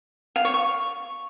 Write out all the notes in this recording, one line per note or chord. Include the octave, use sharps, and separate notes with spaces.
F5
C#5
C#6